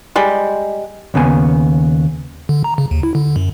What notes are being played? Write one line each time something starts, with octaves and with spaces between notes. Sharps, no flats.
G3 G#3
D#2 C#3 B3 G#5
D3
A#5
C#3
D#2
E4
D3
F#2